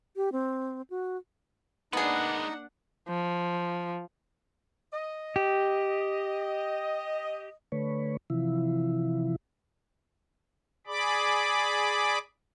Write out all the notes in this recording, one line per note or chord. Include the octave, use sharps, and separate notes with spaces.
G4
C4
F#4
G#3 A#3 B3 D4 D#4 G#4 B4 F#5
F3
D#5
G4
D3 A3 B4 C#5
C3 E3 F3 E4
G#4 D5 B5 D6